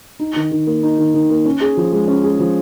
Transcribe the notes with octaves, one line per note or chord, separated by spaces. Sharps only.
D#4
D#3
D#3
A#3
D#4
D#3
D#3
A#3
C#4
G#4
F3
G#3
C#4
G#4
F3